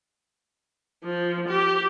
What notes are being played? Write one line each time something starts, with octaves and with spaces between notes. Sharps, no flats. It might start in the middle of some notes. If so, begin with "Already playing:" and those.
F3
G4